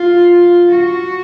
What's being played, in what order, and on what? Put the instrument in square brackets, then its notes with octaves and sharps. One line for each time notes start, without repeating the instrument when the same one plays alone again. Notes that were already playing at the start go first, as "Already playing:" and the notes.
Already playing: [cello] F4
F#4